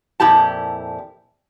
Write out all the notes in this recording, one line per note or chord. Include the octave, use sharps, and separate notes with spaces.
F2 A#2 E4 G4 A5